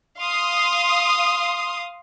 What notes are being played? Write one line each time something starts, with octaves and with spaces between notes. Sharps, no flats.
F5 C6 D#6